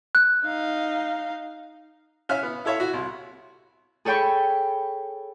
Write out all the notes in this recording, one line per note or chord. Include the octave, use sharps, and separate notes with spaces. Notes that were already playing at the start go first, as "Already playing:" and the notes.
F#6
D#4 F5
C#4 E5 F5 F6
B3
E4 A4 C#5 E5 F5
E4 F#4
C2
G#4 A4 C#5 G5 B5 C#6